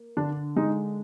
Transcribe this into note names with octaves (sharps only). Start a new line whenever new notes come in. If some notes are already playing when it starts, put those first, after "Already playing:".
Already playing: A#3
D3 D4
G#3 D#4